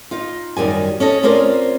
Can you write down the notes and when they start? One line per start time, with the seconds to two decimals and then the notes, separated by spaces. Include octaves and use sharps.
0.11 D#4 F4
0.56 F#2 D#3 G3 G#5
1.00 C#4 A4 D#5
1.23 C4 C#4 F4 A#4 C5 D5